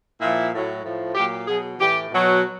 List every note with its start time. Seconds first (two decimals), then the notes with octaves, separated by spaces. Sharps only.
0.20 A#2 F3 E4
0.53 A2 F#3
0.83 A2 F3
1.15 A#2 F#3 G4
1.47 B2 F#3 G#4
1.79 A2 E3 G4
2.11 B2 F#3